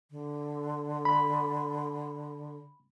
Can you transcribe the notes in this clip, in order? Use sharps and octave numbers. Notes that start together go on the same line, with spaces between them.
D3
B5